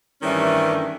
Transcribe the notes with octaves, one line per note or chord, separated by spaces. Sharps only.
G2 D#3 E3 G3 A3 C#4